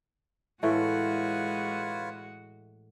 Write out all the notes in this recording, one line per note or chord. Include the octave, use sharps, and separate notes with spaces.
A2 E3 G#3 A3 F4 F#4 B4 C#5